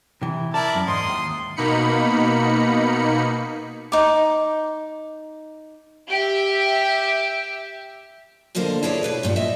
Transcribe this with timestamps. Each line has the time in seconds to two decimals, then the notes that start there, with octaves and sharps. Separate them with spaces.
0.22 C3 E3
0.54 E4 A#4 D5 A5
0.75 F#2
0.88 E2 G#2 C6 D#6
1.08 D#2
1.56 B2 A#3 D#4 B5 C#7
3.92 D#4 D6
6.10 G4 E5
8.55 D2 B2 D3 A#3 C5
8.83 E4 G#4 B4 C#5 D5
9.03 B2 B4 D5
9.23 G2 A#2 D#3
9.36 D#5 E5